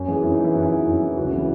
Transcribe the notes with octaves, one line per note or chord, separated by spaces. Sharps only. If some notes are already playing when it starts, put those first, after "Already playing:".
Already playing: F#2
E3 G#4
F#2 E4
D#4
E3 E4
F#2 F#4
E4
E3
F#2
E3
C#2 F#4
F#4
C#3 E3
E4